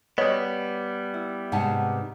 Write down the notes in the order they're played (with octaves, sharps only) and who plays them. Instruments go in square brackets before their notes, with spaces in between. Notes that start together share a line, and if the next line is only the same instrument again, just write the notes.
[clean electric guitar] G3 B3 [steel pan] C#5 D#5
[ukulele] E4
[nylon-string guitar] G#2 C3 D#4 [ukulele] F#5 G#5 A5